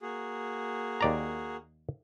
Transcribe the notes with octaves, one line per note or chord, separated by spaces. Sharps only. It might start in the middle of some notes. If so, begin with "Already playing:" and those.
A#3 F#4 G#4
D#2 D5 A#5